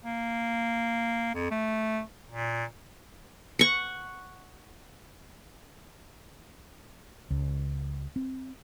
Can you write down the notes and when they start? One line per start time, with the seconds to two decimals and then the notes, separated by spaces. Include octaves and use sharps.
0.05 A#3
1.34 F2
1.51 A3
2.30 A#2
3.59 F#5 C#6
7.30 C#2
8.16 C4